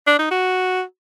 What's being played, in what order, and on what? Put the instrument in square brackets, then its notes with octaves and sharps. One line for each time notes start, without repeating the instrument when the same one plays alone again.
[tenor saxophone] D4
D#4
F#4